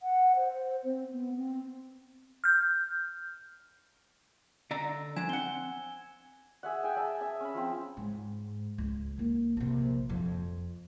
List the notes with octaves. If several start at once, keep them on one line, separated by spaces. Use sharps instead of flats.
F#5
C5
C4
B3
C4
F6 G6
D3 D5 A#5 E6
F3 D4 G#5 G#6 E7
C4 F#5 G#5 G7
G#4 E5 F#5
G#4 G5 G#5
E5 G#5 A5
G#4 E5
C#4 B5
F3 C4
G#2
C#2
D#3 A#3
A#1 C3
F2